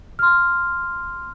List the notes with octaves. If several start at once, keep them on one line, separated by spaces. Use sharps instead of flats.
C6 F6